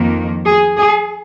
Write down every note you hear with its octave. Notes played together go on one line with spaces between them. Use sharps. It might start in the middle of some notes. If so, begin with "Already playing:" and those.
Already playing: F2 D#3 A#3
G#4
G#4